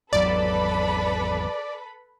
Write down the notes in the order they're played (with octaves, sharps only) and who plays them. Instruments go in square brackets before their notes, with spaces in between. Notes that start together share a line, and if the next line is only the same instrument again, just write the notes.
[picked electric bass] G#1 E2 F#3 [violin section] A4 B4 B5 [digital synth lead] D5